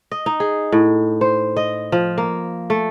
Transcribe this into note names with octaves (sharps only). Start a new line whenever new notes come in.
D#5
D#4
G#4
A2
C5
D#5
F3
A#3
A3